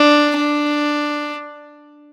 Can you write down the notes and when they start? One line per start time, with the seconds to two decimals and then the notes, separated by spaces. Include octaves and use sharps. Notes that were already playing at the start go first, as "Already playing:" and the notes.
Already playing: D4
0.37 D4